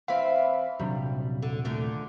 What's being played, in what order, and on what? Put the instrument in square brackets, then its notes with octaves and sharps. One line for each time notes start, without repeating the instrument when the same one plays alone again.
[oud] E3 C4 [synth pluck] E5 F5 B5
[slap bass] D#1 C3 D4 [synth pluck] F#3 [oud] G3
[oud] D3
A#2 D3 A3